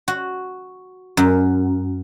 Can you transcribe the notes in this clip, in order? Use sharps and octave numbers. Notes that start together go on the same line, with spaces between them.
F#4
F#2